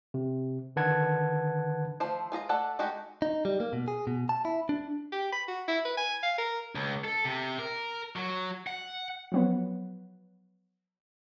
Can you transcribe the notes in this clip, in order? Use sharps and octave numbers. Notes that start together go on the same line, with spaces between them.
C3
D3 D#3 B4 F#5 A5 G#6
F3 A3 C5
G#3 F4 D#5 A#5
A3 A4 D5 F#5
G#3 A3 D#4 F#4 G4
D#4
G3
A#3
B2
G#4
B2
A5
E4
D4
G4
B5
F#4
E4
B4
G#5
F5
A#4
C#2
A4
C3
A#4
F#3
F#5
F3 F#3 B3